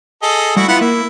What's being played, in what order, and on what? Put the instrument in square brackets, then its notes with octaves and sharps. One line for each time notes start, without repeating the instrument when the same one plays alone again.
[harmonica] G#4 A4 D#5
[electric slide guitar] G3 A3 F#5 [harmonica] E4 F#4
[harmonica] B3 F#5 B5 [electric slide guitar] E4 F4
[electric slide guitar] A#3 [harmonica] E4